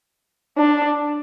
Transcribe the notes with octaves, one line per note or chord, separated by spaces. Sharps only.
D4